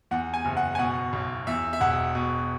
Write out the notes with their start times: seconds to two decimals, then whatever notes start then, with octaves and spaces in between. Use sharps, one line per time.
0.11 E2 F#5
0.34 G#5
0.45 F#1
0.57 F#5
0.75 G#5
0.79 B2 F#5
1.13 B1
1.47 E2 E5
1.73 E5
1.81 E1 F#5
2.15 B2